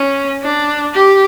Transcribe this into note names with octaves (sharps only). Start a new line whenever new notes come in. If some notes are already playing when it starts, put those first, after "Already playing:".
Already playing: C#4
D4
G4